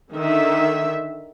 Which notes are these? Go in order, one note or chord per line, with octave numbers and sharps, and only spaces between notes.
D3 D#3 E5